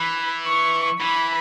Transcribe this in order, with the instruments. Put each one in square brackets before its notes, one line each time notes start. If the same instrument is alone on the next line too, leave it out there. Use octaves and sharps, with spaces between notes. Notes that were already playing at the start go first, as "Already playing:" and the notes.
Already playing: [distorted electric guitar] E3 [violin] B5
[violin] C#6
[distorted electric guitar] E3 [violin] B5